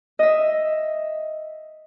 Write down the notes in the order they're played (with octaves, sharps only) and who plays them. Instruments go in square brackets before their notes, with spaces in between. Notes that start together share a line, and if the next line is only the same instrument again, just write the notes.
[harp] D#5 E5